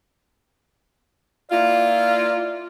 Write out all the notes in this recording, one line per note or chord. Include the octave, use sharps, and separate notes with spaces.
A#3 E4 F4 D5